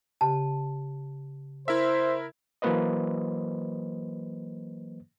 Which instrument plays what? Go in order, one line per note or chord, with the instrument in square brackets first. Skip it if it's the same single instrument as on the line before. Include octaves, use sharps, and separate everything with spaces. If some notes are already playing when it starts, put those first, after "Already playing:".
[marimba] C#3 G4 [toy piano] A5
[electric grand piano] E4 A#4 E5 [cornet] C5
[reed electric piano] E3 F#3 A#3 B4 C5 D#5